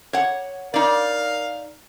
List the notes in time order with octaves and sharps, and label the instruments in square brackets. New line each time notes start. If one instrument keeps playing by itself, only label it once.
[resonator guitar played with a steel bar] C#5 F#5
[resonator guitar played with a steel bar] D#4 D5 [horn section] A#4 F5